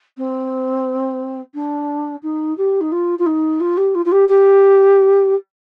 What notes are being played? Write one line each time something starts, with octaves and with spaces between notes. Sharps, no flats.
C4
D4
D#4
G4
D#4
F4
F4
D#4
F4
G4
F4
F4
G4
G4